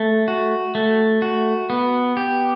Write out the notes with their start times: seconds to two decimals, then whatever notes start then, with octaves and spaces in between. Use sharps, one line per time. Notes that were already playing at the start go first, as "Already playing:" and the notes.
Already playing: A3
0.28 F#4
0.75 A3
1.22 F#4
1.70 B3
2.17 G4